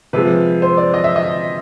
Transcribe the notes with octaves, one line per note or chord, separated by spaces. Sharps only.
C3 F3 G#3 B4
C5
D5
D#5
E5
D#5